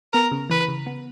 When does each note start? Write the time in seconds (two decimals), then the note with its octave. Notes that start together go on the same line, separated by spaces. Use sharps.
0.13 B3 A#4
0.31 C#3
0.50 E3 B4
0.68 C#3
0.86 B3